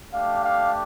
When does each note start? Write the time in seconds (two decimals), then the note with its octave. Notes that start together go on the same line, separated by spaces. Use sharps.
0.13 A3 D4 G4 F5
0.44 F5